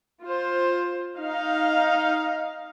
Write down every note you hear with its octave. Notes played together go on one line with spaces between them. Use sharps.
F4 C5
D#4 F5